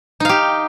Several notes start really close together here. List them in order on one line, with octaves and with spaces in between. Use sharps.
D#4 F5 G4